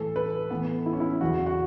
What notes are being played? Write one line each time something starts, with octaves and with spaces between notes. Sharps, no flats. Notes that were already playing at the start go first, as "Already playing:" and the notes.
Already playing: A2 E3 A4
B4
A2 E3 B3
E4
C#4
E4
E2 C#3 E3 F#4
F#4